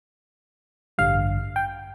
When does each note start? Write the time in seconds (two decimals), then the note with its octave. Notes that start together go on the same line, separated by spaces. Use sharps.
0.98 A1 G2 D3 G3 F5
1.56 G5